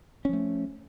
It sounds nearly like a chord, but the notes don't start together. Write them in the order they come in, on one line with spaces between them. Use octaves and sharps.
C#4 F3 A3